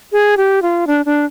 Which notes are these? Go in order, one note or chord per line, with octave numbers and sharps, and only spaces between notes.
G#4
G4
F4
D4
D4